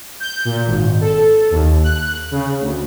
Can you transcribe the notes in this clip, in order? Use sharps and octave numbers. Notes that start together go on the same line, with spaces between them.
G6
A#2
G#1
A4
D#2
F#6
C#3
D2